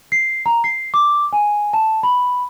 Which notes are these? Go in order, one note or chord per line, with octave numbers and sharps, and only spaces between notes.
C7
A#5
C7
D6
G#5
A5
B5